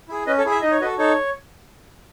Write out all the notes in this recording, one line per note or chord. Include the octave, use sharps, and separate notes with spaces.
E4 G#4
C#4 B4 D#5
A4 C#5
E4 G#4
E5
D#4 D#5
C#5
F#4 A4 B4 D#5
D#4 A4 C#5